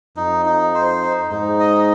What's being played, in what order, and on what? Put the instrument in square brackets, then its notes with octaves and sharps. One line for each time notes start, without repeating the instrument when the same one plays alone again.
[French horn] F2 [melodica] D#4
[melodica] D#4
C5
D#4
[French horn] G#2 [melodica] D#4
[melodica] D#5